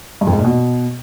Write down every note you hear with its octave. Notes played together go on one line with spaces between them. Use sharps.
G2
F2
G#2
A#2
B2